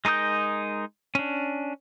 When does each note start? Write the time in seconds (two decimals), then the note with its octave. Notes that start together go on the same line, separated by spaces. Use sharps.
0.05 G#3 D#4 A#4 D#6 G6
1.15 C#4 D4